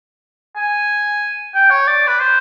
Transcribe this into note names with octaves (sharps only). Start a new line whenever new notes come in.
G#5
G5
C#5
D5
B4
C5